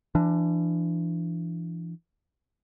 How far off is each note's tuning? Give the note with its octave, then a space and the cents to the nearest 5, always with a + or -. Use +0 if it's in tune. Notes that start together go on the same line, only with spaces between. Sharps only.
E3 +35 D4 +10